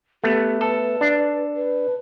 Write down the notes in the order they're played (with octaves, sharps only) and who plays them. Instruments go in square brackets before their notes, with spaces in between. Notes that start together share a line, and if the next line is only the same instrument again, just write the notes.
[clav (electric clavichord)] A3 B3 [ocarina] G4
[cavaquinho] A4 [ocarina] B4
[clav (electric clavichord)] D4
[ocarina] B4